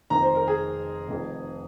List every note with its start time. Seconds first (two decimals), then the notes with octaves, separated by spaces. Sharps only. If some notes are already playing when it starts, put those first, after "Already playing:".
0.10 F1 F2 D#3 A#5
0.23 C5
0.35 A#4
0.48 G#4
1.09 F1 F2 D#3